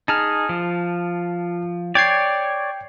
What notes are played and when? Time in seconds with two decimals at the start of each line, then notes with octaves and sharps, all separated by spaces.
0.08 D#4 G#4 A5 F6
0.49 F3
1.95 C#5 D5 G5 G#6 C7